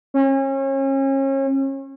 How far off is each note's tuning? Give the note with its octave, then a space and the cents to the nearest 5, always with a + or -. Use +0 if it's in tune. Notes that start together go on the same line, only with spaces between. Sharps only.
C#4 -35